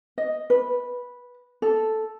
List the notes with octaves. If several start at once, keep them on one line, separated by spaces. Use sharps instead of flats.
D#5
B4
A4